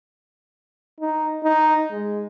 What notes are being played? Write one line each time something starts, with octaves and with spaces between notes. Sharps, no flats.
D#4
D#4
G#3